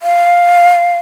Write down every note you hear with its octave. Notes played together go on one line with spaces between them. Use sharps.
F5